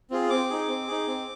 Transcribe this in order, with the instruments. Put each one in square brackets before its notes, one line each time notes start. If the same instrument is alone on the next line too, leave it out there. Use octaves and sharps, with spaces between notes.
[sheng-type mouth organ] C4 F4 G#4
C4 D6
D#4 G#4
C4
D#4 G#4
C4